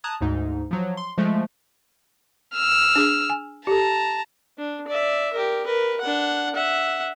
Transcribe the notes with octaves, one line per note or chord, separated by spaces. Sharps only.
A5 A#5 D#6 F#6 G#6
D2 G#2 D#4
F3 F#3
C6
F3 G#3 A3
E6 F6
D4 G#4
G#5
G4 A4 A5 A#5
D4
D5 E5
G4 A#4
A#4 B4
D4 F#5
E5 F#5